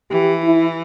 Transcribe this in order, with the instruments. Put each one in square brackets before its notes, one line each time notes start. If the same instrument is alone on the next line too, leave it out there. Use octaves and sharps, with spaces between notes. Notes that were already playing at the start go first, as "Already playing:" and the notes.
[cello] E3 [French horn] G4
[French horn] E4